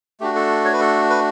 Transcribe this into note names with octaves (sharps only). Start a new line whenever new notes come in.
A3 D4 F#4 G4
A4
C#5
B4
A4
B4